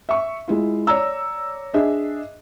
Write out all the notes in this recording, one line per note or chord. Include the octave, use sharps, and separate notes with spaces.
E5 C#6
G#3 E4 F4
C#5 D5 A#5 E6
D4 G#4 D#5 E5